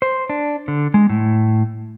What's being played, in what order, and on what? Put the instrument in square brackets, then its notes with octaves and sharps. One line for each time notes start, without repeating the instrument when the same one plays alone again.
[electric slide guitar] C5
D4
D3
G#3
A2